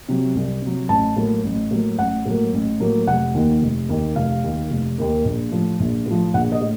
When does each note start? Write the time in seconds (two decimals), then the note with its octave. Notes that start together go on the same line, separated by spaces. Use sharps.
0.09 C3 F#3
0.35 C2
0.62 C3 F#3
0.89 A1 A5
1.16 A2 F#3 A#3
1.44 A1
1.71 A2 F#3 A#3
1.99 A1 F#5
2.26 A2 F#3 A#3
2.53 A1
2.80 A2 F#3 A#3
3.07 F1 F#5
3.34 D#2 D#3 A#3
3.62 F1
3.89 D#2 D#3 A#3
4.16 F1 F5
4.43 D#2 D#3 A#3
4.70 F1
4.98 D#2 D#3 A#3
5.25 A#1
5.52 A2 F3
5.80 A#1
6.06 A2 F3
6.34 A#1 F#5
6.52 D#5
6.61 A2